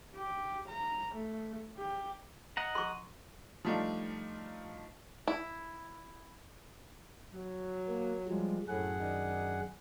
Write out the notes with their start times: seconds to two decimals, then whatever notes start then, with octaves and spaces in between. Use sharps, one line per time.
0.16 G4
0.68 A#5
1.14 A3
1.78 G4
2.57 D#5 F#5 A#5
2.75 C6 C#6
3.65 F3 G3 A3 D4 D#4 F4
5.27 E4
7.34 F#3
7.88 A#3
8.28 F3 G3 G#3
8.68 F#2 A2 G#4 F#5
8.99 D#3 D4 D#4